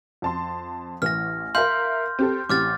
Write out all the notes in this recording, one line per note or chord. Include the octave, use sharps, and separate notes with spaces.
F2 A5 C6
A1 E3 F6 A#6
A#4 E5 F5 C6 F6 G6
C4 G4 A4
A1 C4 G4 D6 F6 A6